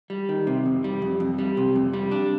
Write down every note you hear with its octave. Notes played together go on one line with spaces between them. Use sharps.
G3
D#3
C3
F2
G3
F2
F2
G3
C3
F2
G3
D4